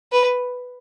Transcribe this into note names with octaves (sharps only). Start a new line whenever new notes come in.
B4